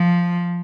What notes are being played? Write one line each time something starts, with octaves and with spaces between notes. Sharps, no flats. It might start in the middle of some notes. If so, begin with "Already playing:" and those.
Already playing: F3